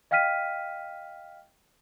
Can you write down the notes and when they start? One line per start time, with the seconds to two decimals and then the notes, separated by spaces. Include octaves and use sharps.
0.11 D#5 F5 G5 F6 B6 D#7